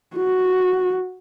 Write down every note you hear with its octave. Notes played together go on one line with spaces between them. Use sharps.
F#4